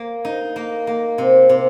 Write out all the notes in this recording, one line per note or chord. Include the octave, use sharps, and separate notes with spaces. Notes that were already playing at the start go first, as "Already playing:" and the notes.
Already playing: A#3
D#4
A#3
A#3
C3
C3